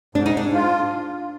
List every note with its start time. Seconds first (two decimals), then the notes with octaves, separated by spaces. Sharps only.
0.15 G#2 D4
0.26 D#4
0.34 G#2 D4
0.53 F4